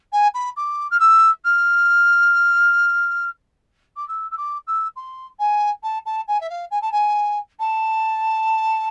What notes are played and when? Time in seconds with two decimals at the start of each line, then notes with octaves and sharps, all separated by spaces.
0.12 G#5
0.34 B5
0.57 D6
0.91 F6
1.00 E6
1.45 F6
3.96 D6
4.08 E6
4.31 E6
4.37 D6
4.67 E6
4.96 C6
5.39 G#5
5.83 A5
6.06 A5
6.28 G#5
6.41 E5
6.50 F5
6.71 G#5
6.82 A5
6.92 G#5
7.59 A5